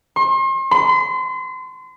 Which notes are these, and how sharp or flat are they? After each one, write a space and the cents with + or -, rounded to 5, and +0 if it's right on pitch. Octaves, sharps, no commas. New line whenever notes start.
C6 +40
C6 -35